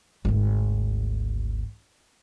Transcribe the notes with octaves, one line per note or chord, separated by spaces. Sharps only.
G#1 D2